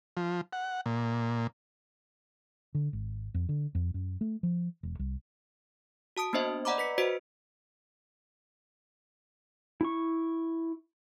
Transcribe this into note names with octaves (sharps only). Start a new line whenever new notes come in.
F3
F#5
A#2
D3
G#1
F2
D3
F2
F#2
A3
F3
E1
C2
F#4 A5 D#6 D7
A#3 B3 D4 C5 D#5 E5
D5 D#5 F#5 A#5 B5 D6
B4 B6 C#7
F#4 B4 C5 D#5 D7
E4 C#6